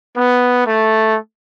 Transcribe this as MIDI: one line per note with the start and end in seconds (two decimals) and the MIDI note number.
0.17 0.63 59
0.67 1.17 57